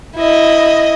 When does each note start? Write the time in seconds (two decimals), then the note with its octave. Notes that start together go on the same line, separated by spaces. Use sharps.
0.15 E4 D#5